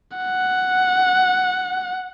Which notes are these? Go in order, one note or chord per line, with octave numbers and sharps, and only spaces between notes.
F#5